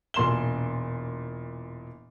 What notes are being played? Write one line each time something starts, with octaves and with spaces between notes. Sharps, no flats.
E1 A#2 C6 E7 G7